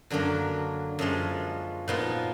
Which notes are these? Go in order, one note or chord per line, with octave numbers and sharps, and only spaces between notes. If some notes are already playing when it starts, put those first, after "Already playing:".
F#2 D3 F#3 A#3 D4
F#2 F3 G#3
A#2 F3 B3 D#4